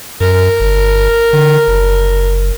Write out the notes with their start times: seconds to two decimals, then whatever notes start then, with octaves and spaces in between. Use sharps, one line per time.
0.20 F#2 A#4
0.60 G1
1.33 D3
1.67 F#1